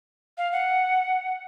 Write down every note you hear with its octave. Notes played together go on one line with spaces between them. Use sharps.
F5
F#5